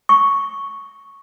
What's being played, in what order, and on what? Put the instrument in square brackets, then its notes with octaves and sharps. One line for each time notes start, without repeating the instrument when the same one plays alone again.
[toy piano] C#6